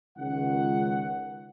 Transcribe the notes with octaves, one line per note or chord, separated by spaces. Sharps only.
C#2 D#3 F#5